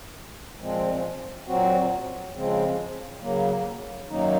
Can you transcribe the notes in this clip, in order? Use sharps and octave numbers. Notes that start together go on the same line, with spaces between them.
A#2 F3 G#3 C4
A#2 F#3 C4 F#4
C#3 F3 G#3 C4
C#3 F#3 A#3
F#2 D#3 F#3 A#3 D#4